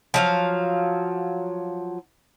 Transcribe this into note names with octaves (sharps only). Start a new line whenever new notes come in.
F3 F#3 F5